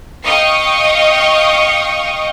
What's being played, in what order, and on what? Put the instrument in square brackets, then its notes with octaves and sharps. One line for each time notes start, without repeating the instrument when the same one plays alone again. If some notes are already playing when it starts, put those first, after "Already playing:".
[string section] D#5 F5 G5 C#6 D#6